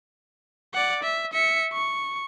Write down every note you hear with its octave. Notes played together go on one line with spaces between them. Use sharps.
D5 F#5
E5
E5 C#7
C#6